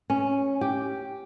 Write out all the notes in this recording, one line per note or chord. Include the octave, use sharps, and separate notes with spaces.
C#4
G4